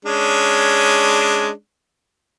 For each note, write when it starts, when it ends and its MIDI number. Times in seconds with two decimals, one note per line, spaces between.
0.05 1.50 56
0.05 1.50 61
0.05 1.50 62